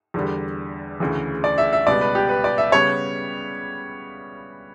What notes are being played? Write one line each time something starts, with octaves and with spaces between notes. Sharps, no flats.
E2 D3 G3
D2 C#3 E3
D5
E5
E5
C#2 B2 G3 B3 D5
B4
G4
B4
D5
E5
C#3 G3 B3 C#5